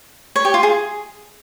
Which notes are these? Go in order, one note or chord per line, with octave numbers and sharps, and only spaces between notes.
C#5
G4
F4
G#4